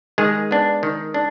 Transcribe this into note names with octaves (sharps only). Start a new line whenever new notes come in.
D#3 G#3 G#4
B3 D4
D#3
D4